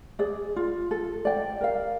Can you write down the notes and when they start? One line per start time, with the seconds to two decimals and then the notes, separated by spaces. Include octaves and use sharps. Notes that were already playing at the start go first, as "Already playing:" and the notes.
0.19 G#4 D5
0.56 F4
0.91 A4
1.25 D5 G5
1.61 A#4 F5